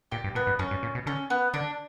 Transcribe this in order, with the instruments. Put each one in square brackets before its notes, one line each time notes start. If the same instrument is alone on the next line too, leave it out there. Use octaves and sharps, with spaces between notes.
[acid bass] A#2 [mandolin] G4
[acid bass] G2
[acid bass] A#2 [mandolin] B3
[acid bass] G2
[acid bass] F#2 [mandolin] C#4
[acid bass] G2
A#2
B2
[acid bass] D3 [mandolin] C#4
[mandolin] B3
[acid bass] D3 [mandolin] D4